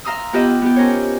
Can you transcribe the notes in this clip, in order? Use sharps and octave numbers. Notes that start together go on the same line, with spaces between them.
E5 F5 A#5 C6 D#6 E6
B3 F4 G4 B4 D#5 E5
B3 G4
C#4 A#4 C5 C#5